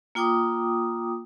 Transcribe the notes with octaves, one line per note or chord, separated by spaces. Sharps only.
A#3 F4 G5 D6 D#6